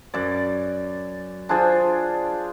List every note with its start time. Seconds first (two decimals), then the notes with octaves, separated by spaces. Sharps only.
0.14 F#2 D5
1.49 D4 F4 G#4 C5